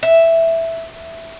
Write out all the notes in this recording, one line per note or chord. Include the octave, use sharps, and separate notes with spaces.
E5